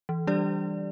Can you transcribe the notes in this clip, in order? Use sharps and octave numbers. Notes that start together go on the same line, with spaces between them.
E3
G3 D4 G4 D5